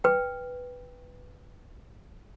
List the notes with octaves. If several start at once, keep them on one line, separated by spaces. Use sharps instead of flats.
B4 G5